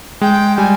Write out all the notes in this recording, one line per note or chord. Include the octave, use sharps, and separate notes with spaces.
G#3 G5
G3 G#5